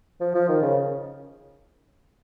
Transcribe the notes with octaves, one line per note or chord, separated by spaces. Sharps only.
F3
F3
D#3
C#3